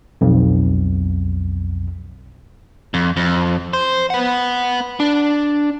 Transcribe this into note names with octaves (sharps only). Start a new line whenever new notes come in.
B1 F2
F2
F2
C5
B3 F#5
D4